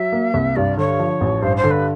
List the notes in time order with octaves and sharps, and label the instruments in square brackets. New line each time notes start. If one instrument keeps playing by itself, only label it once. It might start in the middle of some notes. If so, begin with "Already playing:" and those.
Already playing: [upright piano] F#3 [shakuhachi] E5
[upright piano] A#3
C2
[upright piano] G2 [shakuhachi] D5
[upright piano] D3 [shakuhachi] C#5
[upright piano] F3
A1
[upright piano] G2 [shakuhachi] C5
[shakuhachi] C5
[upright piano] D3
[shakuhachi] B4